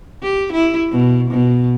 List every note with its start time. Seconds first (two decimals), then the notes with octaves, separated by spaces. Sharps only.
0.23 G4
0.52 E4
0.91 B2
1.31 B2